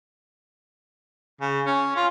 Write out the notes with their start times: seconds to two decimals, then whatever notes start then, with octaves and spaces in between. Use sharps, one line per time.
1.41 C#3
1.66 C#4
1.96 F4